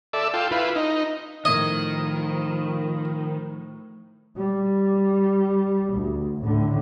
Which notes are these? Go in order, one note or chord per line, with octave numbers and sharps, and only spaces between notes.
A4 D5 E5
F4 A4 G5
E4 F4 B4
D#4
A2 D#3 F3 A#4 D#5 G#6
G3
D2
A2 D3